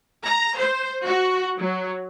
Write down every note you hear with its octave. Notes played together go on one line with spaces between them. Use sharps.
A#5
C5
F#4
F#3